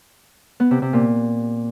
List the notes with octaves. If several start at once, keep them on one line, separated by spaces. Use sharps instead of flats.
B3
C3
C3
A#2